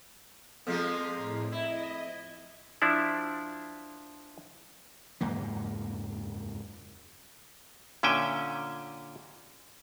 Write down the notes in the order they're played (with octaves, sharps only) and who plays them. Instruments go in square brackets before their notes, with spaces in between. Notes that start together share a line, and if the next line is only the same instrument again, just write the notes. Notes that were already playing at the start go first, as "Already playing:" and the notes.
[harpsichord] F2 [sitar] F3 G#3 A#3
[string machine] A2
[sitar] E4 [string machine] D#5
[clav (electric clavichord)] F3 D4 E4 D5
[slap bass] F#1 E2 G#2 A#3
[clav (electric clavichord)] A#2 D3 C#4 E5 G5 G#5